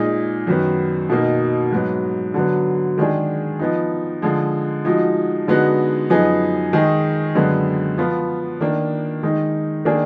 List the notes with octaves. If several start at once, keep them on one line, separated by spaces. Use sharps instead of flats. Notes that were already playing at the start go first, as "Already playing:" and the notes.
Already playing: A#2 G#3 D#4 G#4
F#2 D#3 F#3 B3
B2 A#3 D#4
G#2 F#3 B3
D3 F#3 B3
D#3 G#3 D4 G#4
F3 B3 D#4
D3 F3 G#3
F3 G#3 D#4 F#4
D3 G#3 B3 D#4 F#4
F#2 F3 B3 D#4 G#4
D#3 G#3 D#4 G#4
F#2 D3 G#3 B3
F3 B3 F4
D#3 A#3 D4
D#3 G#3 D#4
D#3 A#3 D4 G#4